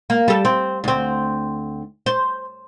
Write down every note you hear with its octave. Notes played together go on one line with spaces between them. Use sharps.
A#3
G3 A4
C4
D2 C4
C5